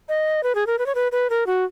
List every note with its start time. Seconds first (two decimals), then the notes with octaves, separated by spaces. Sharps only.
0.09 D#5
0.43 B4
0.55 G#4
0.67 A#4
0.79 B4
0.86 C#5
0.95 B4
1.12 B4
1.30 A#4
1.47 F#4